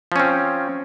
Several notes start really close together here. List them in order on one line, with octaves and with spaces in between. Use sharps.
F3 C#4 C4